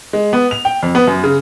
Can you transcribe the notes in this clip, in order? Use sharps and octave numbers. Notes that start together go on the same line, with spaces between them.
G#3
B3
F7
G5
F2
B3
F#2
C#3